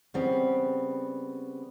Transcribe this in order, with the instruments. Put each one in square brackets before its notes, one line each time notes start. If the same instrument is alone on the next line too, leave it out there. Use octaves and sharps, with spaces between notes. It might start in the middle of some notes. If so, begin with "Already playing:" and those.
[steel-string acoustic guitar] C#3 G3 B3 C4